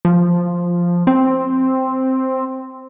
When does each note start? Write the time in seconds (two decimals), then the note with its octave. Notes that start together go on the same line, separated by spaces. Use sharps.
0.05 F3
1.07 C4